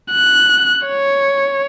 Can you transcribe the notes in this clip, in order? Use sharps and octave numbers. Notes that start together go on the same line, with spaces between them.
F#6
C#5